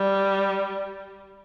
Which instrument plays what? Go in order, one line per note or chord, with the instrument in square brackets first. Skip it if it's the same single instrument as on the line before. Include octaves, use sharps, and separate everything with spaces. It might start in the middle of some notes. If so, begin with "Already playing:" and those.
Already playing: [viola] G3